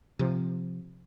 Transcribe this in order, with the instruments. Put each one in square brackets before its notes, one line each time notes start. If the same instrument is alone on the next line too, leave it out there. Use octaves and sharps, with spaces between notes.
[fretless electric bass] C3 F3